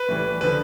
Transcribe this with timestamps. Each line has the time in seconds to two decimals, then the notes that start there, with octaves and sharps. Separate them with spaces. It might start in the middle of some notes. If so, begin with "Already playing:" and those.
Already playing: B4
0.09 A2 E3 G3
0.41 D3 F3 B4